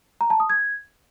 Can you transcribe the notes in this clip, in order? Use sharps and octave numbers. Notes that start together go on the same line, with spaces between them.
A#5
A5
D#6
G#6